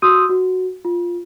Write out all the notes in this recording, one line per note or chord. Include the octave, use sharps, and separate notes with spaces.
F#4 C6 D#6 E6 G6 D#7
F#4
F4